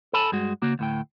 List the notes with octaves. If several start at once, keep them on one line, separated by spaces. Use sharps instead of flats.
A4 G#5 A5 B5
G2 G#3 F#4
C#3 A#3 F#4
D2 A2 G5